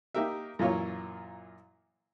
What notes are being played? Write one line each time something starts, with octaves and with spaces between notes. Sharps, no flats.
A#3 D#4 G4 A#4 E5
F#2 A#2 E3 A#3 F4 C#5